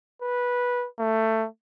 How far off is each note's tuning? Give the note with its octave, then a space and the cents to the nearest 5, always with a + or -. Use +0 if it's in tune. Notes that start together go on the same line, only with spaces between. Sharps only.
B4 -15
A3 +15